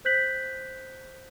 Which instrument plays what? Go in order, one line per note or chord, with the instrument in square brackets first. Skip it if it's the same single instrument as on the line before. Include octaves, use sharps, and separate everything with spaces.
[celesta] C5 F#6 G6 B6 F#7